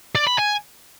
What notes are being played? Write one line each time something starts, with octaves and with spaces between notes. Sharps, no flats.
D5
B5
G#5